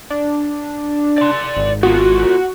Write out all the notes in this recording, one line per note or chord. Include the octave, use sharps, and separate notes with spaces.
D4
D5 C6
G#1
B3 F4 F#4